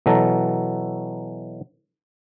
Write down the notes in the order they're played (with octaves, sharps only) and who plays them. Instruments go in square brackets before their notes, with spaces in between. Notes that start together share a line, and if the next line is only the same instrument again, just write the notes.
[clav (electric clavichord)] B2 E3 F#3 A4 A#5